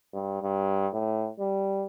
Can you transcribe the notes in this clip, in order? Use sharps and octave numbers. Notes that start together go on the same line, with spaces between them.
G2
G2
A2
G3